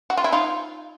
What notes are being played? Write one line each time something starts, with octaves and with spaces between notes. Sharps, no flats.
F#4
F4
E4
D#4 F4